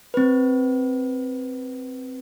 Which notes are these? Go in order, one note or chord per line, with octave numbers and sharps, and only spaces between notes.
C4 B4